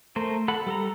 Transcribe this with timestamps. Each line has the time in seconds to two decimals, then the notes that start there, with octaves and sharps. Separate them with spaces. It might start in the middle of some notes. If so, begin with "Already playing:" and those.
0.16 A3 A#4 C5
0.48 A4 F#5 B5
0.67 G3 A4 A#5